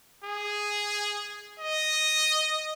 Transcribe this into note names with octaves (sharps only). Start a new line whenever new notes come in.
G#4
D#5